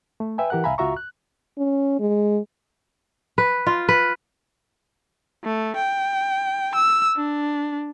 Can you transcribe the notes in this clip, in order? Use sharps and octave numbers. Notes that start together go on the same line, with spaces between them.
A3
B4 E5 G5 G#5
E3 G4 A#4 F#5 F#6
C2 E5 F5 G#5 A#5 B5
C#2 F4 F#4 E5 A#5 C#6
F#6
C#4
G#3
B4
F4
B4
A3
G5
E6
D4